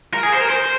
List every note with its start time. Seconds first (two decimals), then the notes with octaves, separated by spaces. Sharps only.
0.14 A#4
0.23 G#4
0.33 C5
0.41 A#4
0.50 C5